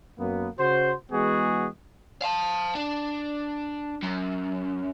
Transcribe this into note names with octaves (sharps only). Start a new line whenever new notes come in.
F#2 F#3 A#3 B3
C#3 F#4 C5
E3 G#3 B3 F#4 G#4
F5 A5
D4
F#2